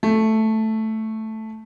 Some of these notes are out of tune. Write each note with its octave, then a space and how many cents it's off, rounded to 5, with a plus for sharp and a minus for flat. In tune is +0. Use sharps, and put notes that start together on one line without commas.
A3 +0